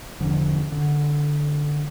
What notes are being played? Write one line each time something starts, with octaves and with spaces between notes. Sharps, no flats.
E1 D3 F3
D3